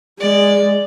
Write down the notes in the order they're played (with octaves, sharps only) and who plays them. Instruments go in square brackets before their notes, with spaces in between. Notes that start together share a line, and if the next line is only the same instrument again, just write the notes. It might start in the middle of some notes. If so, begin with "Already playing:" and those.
[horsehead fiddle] G#3 [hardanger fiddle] D5